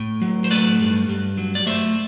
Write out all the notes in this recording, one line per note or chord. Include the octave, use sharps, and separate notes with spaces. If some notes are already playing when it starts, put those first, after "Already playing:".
Already playing: A2
F#3
C5
A3 B4 D5
G2
G2
F#3
D5
A3 C5 E5